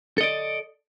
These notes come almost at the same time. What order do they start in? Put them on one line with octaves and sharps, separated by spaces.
A4 D#5 D5